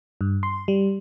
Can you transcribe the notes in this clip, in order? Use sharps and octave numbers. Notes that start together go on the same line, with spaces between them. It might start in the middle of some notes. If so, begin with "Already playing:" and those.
G2
C6
G3